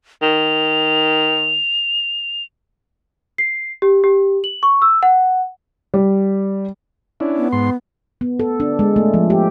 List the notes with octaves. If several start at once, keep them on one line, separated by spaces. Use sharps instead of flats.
D#3 F7
C7
G4
G4
F#7
C#6
E6
F#5
G3
C#4 D4 E4
B3
G#2 C6
B3
A4
D4
G#3
A3
F3
G4